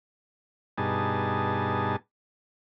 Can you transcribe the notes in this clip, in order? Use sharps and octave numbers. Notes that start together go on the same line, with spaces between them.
G2 B2 D#4 G#4 A5